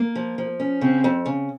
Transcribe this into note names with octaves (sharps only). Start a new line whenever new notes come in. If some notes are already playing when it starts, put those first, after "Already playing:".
Already playing: A#3
F3
F3
C#4
C#3 C4
F2
C#3